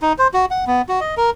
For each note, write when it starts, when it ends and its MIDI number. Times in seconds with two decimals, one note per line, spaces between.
0.02 0.13 63
0.18 0.28 72
0.34 0.45 66
0.51 0.65 78
0.67 0.82 59
0.89 1.00 66
1.01 1.15 75
1.17 1.30 70